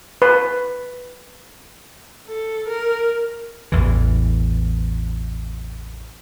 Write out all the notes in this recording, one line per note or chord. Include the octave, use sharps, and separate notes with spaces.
B4
A4
A#4
A1 E2 E3